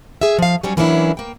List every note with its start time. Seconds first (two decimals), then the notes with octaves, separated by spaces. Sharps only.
0.21 G#4 E5
0.39 F3 F5
0.63 F#3 G3 C#4 C#5
0.77 E3 F#3 A#3 C#4 D4 E4
1.17 A#3 G5